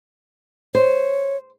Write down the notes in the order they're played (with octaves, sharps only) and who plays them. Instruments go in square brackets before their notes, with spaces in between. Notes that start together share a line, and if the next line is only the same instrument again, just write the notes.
[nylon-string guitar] C5 [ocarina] C#5